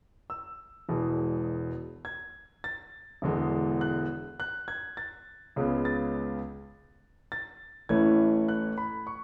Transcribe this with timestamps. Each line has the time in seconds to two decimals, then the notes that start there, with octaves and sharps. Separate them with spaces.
0.30 E6
0.89 E1 E2 B2 G#3
2.05 G#6
2.64 A6
3.22 E1 E2 D3 G#3
3.81 F#6
4.40 F#6
4.68 G#6
4.97 A6
5.56 C#2 C#3 G#3 B3
5.85 A6
7.32 A6
7.89 A1 A2 E3 A3 C#4 G#6
8.48 F#6
8.78 B5
9.07 C#6